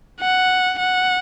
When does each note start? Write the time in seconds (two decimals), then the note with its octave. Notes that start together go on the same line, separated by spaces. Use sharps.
0.21 F#5
0.80 F#5